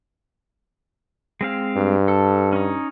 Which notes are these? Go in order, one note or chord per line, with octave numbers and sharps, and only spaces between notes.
G#3 C4 F5
G2
A4
C#4 D#4